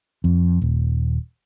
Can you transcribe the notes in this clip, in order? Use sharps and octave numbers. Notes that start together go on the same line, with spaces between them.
F2
D#1